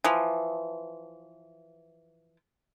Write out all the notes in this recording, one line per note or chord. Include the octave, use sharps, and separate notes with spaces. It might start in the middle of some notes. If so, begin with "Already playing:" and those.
E3 F3